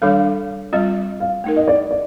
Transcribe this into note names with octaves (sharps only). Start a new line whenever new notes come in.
D#3 G3 D4 A4 F5
G3 C4 F4 D#5
F5
A3 D#4 A#4
D#5
D5
D5